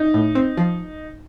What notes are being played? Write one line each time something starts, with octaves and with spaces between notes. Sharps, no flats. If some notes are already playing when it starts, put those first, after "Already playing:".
Already playing: D#4
A2
C4
F3